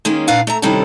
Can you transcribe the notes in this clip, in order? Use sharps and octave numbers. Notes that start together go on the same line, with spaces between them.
D#3 G#3 A#3 C#4
A#2 D4 B4 F5 F#5
A3 E5 A#5
C3 D#3 G3 C#4 E4 A4